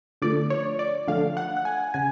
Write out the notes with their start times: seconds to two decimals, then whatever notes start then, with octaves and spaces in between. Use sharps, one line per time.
0.22 D3 F3 A3 D5
0.50 C#5
0.79 D5
1.08 D3 F3 A3 F5
1.37 F#5
1.57 F#5
1.65 G#5
1.94 C#3 G#5